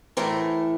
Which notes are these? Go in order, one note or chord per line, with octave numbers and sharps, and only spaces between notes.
A2 E3 A3 A#4 C5